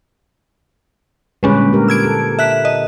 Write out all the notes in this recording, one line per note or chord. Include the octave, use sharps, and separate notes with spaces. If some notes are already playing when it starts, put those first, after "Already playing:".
A#2 D3 G3 G#3 C#4 B4
G4 A#4
E6 G#6 D7
A4
E5 F#6 B6
D#5